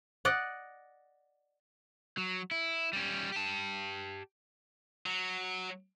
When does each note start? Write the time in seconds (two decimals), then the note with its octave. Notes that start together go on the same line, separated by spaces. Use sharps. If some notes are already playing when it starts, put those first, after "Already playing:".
0.25 D5 D#5 F#5
2.18 F#3
2.51 E4
2.93 G3 C#4
3.32 G4 A5
5.06 F#3